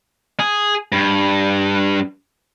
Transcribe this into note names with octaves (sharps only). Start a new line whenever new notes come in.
G#4
G2